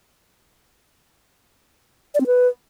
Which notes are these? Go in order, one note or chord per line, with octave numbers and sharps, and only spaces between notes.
D5
C4
B4